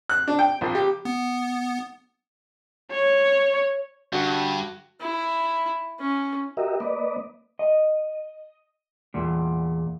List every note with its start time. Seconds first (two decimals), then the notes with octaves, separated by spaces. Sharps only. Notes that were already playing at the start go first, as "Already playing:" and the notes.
0.09 F#6
0.28 D4
0.39 G5
0.61 A#1
0.75 G4
1.05 B3
2.92 C#5
4.13 G2 D3 F#4
5.00 E4
6.00 C#4
6.57 F#4 G4 A#4 D#5 E5
6.80 A#3 B4 D5 D#5
7.59 D#5
9.14 E2 A#2